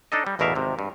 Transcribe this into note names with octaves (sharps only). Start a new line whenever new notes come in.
D4 D#4 A4 D#5
G3
A1 E2 B2 A#4 E5 F5
G#1 C3
G2